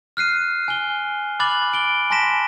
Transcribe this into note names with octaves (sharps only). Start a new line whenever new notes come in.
F6 F#6 C7 D#7
G#5 G7
B5 D6 F#6 A6 F#7
D7 G7
G#5 A5 C6 A#6 B6 E7